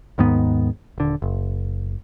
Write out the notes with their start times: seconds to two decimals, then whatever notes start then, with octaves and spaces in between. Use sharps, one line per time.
0.18 D#2 G#2 D#3 B3
0.98 D#1 D3
1.22 F#1